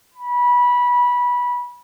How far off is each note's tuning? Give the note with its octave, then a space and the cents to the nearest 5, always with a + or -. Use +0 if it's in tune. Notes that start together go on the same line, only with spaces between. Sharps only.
B5 -20